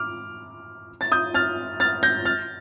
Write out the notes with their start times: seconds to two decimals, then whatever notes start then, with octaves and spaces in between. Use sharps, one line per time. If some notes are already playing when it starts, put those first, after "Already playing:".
Already playing: D6 F6
1.01 A6
1.12 D#6 G6
1.34 F6 A6
1.80 F6 A6
2.03 G6 A#6
2.25 F6 A6